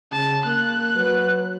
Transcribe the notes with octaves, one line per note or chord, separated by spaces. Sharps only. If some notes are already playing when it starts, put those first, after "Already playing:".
C#3 A5
A#3 F#6
F#3 B4